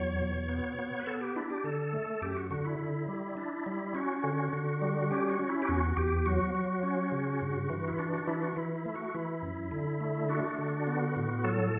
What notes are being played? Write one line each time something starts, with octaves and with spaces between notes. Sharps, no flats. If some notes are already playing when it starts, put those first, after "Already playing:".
Already playing: E2 F#3 C#5
B2
B3
B3
B4
B3 A4
G4
D4 E4
G4
D3 A4
A3
F#2 G4
F#4
D3 F#4
E4
D3
G3
D4
G3
C#4 F#4
D3
D3
G3
C#4 G4
F#4
C#4
E4
G4
E2 F#4
E2 G4
F#3 F#4
F#3
C#4
C#3
G2
E3
E4
D4 F#4
F#4
E3 E4
F#4
E3 E4
E4
A3
F#4
E3 E4
F#2
D3
A3
D4 F#4
D3
B3
A2
F#3 A4